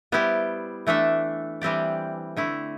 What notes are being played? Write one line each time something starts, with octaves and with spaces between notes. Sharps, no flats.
G3 B3 E4 G4 C5
E3 A3 D4 A4 E5
E3 G3 C4 G4 D5
D3 A3 E4